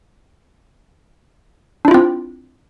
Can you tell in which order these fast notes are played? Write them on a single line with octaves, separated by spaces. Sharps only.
D4 E4 F4 C4